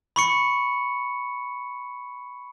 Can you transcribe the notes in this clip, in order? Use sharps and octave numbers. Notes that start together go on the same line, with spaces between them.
B5 C#6 C#7